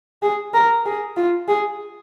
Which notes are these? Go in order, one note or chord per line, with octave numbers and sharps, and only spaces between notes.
G#4
A#4
G#4
F4
G#4